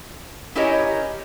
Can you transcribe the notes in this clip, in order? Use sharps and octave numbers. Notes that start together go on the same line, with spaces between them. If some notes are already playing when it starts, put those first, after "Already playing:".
C#4 E4 G4 A#4 C#5 D#5